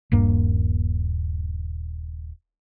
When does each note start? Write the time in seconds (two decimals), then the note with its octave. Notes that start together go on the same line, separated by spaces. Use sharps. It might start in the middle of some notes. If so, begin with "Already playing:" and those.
0.12 D#1 G2 A#3